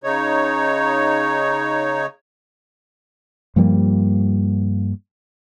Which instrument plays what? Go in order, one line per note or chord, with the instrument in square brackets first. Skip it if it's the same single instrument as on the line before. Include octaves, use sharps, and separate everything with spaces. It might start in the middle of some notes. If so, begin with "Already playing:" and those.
[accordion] C#3 D#4 C#5
[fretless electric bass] G2 F3 G3 A#3